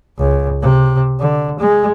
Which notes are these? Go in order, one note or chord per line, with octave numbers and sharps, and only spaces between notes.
C#2
C3
D3
G#3